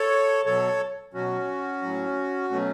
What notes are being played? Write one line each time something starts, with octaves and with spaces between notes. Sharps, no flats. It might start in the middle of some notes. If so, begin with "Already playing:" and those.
Already playing: A4 C#5
B2 F#3 A4 C#5
B2 F#3 C#4 F#4
A2 F#3
B2 F#3 A3 C#4